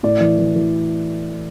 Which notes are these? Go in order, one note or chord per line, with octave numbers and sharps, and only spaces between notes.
A2 D5
E3
E3
E3